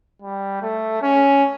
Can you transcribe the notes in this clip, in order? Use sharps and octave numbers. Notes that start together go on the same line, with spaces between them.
G3
A3
C#4